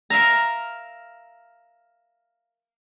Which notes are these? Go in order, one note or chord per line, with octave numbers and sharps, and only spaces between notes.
A#4 E5 F5 A#5